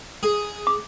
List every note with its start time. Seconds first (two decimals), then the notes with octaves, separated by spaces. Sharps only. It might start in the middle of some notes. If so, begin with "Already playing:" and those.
0.23 G#4
0.67 D6